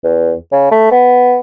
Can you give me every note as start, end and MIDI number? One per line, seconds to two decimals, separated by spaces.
0.04 0.34 40
0.52 0.70 49
0.71 0.91 57
0.91 1.39 59